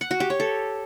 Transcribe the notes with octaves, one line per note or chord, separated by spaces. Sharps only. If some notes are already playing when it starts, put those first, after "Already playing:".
F#5
F#4
G4
C#5
A4